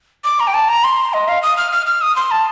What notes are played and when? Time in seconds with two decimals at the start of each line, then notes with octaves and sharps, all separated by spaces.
0.24 D6
0.40 A#5
0.47 G5
0.54 A5
0.68 A#5
0.84 C6
1.13 D#5
1.28 F5
1.43 D#6
1.57 F6
1.72 F6
1.86 F6
2.02 D#6
2.16 C6
2.31 A5